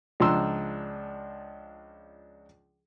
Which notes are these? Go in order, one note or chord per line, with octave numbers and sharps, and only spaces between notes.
C#2 F3 D4 A#5 C6 E6